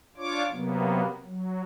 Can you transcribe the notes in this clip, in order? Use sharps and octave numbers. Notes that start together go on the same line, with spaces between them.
D4 F4 C#5 D6
C3 F#3 A#3 B3
F#3